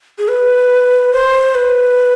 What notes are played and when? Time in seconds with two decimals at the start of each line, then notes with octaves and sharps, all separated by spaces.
0.18 G#4
0.29 B4
1.13 C5
1.55 B4